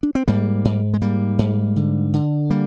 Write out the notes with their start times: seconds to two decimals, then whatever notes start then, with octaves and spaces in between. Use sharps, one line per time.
0.03 D4
0.15 C4
0.28 G#2 G3 A#3
0.65 G#2
0.94 G#3
1.01 G#2 G3 A#3
1.39 G#2
1.76 D3
2.13 D3
2.50 G3 A#3